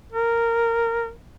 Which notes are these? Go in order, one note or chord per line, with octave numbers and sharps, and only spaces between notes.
A#4